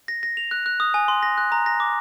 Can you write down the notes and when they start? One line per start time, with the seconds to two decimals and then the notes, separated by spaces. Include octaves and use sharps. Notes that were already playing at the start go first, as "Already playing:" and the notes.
0.08 A#6
0.23 A#6
0.37 F7
0.51 F#6
0.66 F#6
0.80 D#6
0.94 G#5
1.08 C6
1.23 A#6
1.38 F#6
1.52 A#5
1.66 A#6
1.80 D6